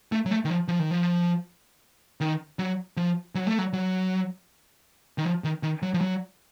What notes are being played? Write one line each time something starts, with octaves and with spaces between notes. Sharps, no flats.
A3
F#3
A3
D#3
F3
F3
D#3
F3
D#3
F#3
F3
F#3
A3
F#3
F#3
D#3
F3
D#3
D#3
F#3
F3
F#3